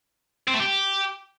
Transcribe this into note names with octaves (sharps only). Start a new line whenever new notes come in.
C4
A3
G4